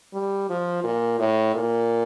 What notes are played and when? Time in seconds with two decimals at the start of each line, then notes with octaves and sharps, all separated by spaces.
0.14 G3
0.50 F3
0.84 A#2
1.19 A2
1.55 A#2